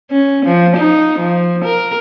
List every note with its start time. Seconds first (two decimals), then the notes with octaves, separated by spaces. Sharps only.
0.11 C#4
0.45 F3
0.77 D#4
1.19 F3
1.64 A#4